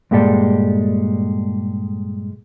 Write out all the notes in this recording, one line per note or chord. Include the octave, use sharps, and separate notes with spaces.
G2 A#2 G#3 G4 A4 D5